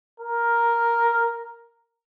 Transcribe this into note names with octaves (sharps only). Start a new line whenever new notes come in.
A#4